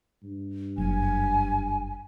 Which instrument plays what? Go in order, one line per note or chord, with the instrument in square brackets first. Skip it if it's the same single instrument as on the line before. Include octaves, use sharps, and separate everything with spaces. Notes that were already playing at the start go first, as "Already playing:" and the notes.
[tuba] G2
[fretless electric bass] F#1 [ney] G#5